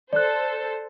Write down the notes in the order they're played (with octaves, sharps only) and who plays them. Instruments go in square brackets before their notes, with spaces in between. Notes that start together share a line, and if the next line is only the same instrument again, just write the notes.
[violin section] A4 C5 [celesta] D5 F#6